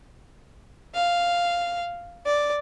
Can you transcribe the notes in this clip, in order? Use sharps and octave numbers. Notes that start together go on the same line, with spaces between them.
F5
D5